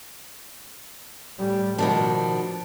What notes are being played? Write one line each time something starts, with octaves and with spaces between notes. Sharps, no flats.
A2 G3
B2 D#3 F3 D4